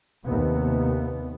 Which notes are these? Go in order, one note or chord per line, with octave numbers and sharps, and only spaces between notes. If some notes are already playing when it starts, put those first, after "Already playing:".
D#2 C3 B3